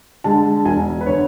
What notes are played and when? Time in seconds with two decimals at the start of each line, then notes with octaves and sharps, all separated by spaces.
0.24 D3 G#3 A5
0.65 E1 G#5
1.01 B4
1.06 D3 C#5